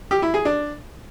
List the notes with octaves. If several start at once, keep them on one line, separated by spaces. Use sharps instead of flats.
G4
E4
G#4
D4